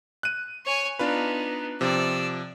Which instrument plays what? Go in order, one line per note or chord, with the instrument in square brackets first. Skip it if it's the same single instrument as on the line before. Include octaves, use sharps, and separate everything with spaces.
[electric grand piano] F#6 D#7
[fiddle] C#5 G#5
[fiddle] B3 D#4 [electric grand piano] D4 F4 B4
[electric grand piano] C3 F3 [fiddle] D5 E6